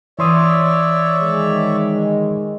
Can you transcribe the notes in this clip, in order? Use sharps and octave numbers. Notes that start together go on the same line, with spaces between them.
E3 C#5 D5 E5 C6 D#6
D#3 G#3